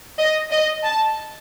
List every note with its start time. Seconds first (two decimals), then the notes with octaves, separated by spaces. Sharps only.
0.19 D#5
0.51 D#5
0.84 A5